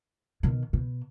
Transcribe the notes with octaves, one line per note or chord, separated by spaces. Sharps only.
B2 D#3
B2